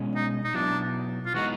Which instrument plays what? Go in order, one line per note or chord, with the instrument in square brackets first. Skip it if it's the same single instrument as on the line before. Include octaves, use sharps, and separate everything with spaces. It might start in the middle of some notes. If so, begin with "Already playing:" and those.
Already playing: [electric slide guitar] B2 G#3 C#4
[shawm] D#4
D#4
[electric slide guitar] B2 F#3 B3 E4 [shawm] D4
[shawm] F4
[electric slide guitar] E3 G#3 B3 D#4 [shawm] F#4